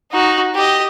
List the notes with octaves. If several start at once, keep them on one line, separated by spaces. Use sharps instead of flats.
D#4 F#4
G4 D#5